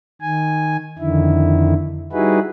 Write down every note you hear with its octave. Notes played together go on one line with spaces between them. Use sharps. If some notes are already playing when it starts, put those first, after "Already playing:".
D#3 G#5
F2 D3 D#3 E4
G3 D#4 E4 F#4 G#4 B4